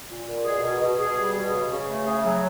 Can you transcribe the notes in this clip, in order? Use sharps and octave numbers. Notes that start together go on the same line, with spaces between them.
A#2
A#2
B2 G#4
B2
B2
B2 G#4
G3
B2
C#3
C#3
A3
C#3 G#4
F#3